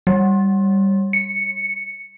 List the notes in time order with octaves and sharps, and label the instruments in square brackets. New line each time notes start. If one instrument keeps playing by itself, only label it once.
[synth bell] G3
C#7